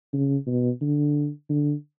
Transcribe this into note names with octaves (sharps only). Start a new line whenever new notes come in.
C#3
B2
D3
D3